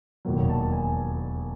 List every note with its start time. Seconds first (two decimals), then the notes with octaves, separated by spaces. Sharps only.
0.25 E1 D#2 D#3 F#3
0.50 A5
0.72 G#5